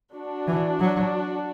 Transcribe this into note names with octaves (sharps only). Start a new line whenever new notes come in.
D4 F#4
E3
F#3